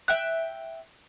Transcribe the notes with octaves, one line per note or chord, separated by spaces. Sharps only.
E5 G5 F#6